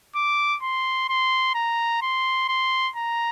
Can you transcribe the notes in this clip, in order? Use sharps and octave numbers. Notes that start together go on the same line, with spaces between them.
D6
C6
C6
A#5
C6
C6
A#5